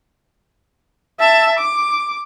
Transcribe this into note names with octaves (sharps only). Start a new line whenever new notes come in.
E5 A5
D6